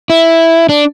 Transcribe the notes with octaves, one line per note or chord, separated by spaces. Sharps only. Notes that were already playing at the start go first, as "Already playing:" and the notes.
E4
D4